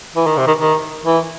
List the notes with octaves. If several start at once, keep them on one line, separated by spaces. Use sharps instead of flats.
E3
D#3
C3
D#3
D#3
E3